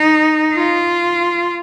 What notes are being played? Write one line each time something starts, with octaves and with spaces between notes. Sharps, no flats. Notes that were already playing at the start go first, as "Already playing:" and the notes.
Already playing: D#4
F4